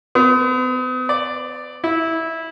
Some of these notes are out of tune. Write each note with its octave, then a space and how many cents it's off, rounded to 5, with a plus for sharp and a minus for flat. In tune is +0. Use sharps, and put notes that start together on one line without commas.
B3 +45
D5 +5
E4 -15